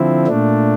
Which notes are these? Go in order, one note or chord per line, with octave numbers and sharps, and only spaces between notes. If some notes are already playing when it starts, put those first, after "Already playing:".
Already playing: D3 F3 C4 E4
A#2 A3 D4